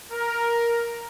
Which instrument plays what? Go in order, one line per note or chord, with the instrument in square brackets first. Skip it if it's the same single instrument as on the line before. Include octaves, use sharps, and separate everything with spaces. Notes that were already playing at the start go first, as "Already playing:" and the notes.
[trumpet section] A#4